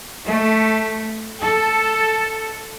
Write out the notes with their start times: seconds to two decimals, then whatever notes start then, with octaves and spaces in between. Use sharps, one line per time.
0.24 A3
1.40 A4